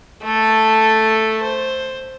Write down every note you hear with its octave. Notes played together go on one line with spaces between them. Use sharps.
A3 A4
C5